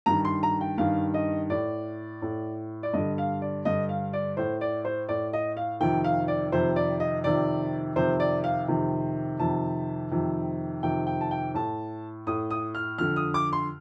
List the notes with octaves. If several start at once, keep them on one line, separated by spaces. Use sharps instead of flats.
G2 D#3 A#5
C6
A#5
G5
G2 D#3 F5
D#5
A2 D5
A2
D5
G2 D3 D#5
F5
D5
G2 D3 D#5
F5
D5
A2 C5
D5
C5
A2 D5
D#5
F5
F2 C3 D#3 G5
F5
D5
F2 C3 D#3 C5
D5
D#5
F2 C3 D#3 D5
F2 C3 D#3 C5
D5
F5
F2 C3 D#3
F2 C3 D#3 A5
F2 C3 D#3
F2 C3 D#3 G5
G5
A5
G5
A2 A5
A2 D#6
D#6
F6
F2 D3 F6
D#6
D6
C6